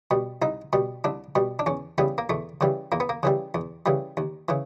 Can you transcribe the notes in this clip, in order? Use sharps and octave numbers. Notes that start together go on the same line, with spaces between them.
B2 G3
C2 D#4
B2 G3
C2 D4
B2 G3
D4
E2 C#4
C#3 E3 G3 B3
A#3
E2 A3
C#3 E3 G3
E2 A#3
B3
A#3
C#3 E3 G3
E2
C#3 E3 G3
D#2
C#3 E3